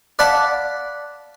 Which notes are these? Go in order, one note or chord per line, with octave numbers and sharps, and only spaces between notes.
D5 F5 F#5 A5 B5